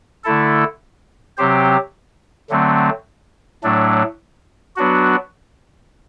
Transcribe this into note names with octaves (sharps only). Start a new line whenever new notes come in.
D3 A3 E4 A4
C3 F#3 C4 G4 C5
D3 F#3 A3 C4
A2 F#3 A3 D4
F#3 B3 D4 F#4